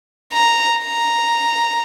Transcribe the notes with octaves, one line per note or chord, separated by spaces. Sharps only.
A#5
A#5